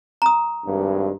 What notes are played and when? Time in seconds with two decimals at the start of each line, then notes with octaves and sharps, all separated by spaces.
0.22 A#5 D#6
0.65 G#1 G2